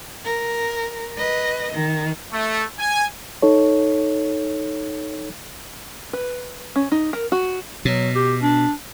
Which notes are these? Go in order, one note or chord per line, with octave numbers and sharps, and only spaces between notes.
A#4
B4 D#5
D#3
A3
G#5
D#4 A4 C#5
B4
C#4
D#4
A#4
F#4
B2 F#3
G4
D4